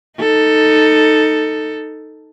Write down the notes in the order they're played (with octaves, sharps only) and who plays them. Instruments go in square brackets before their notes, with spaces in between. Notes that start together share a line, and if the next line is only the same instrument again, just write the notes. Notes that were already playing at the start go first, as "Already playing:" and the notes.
[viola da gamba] D#4 A4